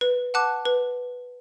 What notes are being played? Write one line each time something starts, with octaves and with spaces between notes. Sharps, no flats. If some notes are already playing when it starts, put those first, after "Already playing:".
B4
F#5 A5 D6 F#6
B4